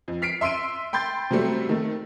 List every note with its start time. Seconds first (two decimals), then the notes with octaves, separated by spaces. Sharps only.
0.08 F2
0.22 F6 B6 C7 D7
0.41 E5 C6 E6 D7 D#7
0.93 G5 B5 C6 G6 A6
1.31 C3 F#3 G3 A3 C4
1.69 D#3 A3